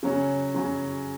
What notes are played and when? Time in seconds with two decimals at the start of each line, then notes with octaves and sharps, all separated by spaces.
0.03 C#3 F#3 C#4
0.54 C#3 F#3 C#4